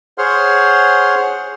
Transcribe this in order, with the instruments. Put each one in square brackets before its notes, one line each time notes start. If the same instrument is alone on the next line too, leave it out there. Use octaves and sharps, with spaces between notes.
[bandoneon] G#4 C5 C#5 F#5 C6 F6